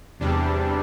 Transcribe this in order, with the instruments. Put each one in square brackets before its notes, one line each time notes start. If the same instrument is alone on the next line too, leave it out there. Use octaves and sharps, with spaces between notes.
[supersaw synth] E2 C3 G3 D4